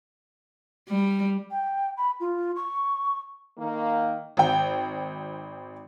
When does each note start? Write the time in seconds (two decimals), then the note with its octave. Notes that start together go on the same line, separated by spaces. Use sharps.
0.89 G3
1.51 G5
1.97 B5
2.20 F4
2.56 C#6
3.58 D#3 A#3
4.37 G#1 G5